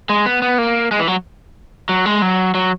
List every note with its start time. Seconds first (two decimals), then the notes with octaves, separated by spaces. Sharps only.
0.09 G#3
0.26 B3
0.42 B3
0.58 A#3
0.91 G#3
1.00 E3
1.08 F#3
1.89 F#3
2.06 G#3
2.22 F#3
2.54 F#3